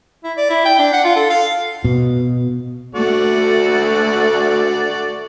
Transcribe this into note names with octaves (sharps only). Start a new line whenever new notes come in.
E4
D5
E4
G5
D4
F#5
F4
A4
F5
B2
D2 A3 F#4 D5